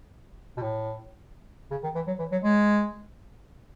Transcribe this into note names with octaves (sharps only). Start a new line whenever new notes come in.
B2
A2
C#3
D#3
E3
F#3
E3
F#3
G#3